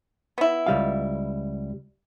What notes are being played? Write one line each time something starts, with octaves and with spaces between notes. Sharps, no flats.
B3 E4
C#2 G3 F5